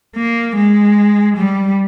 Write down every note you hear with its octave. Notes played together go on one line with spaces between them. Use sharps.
A#3
G#3
G3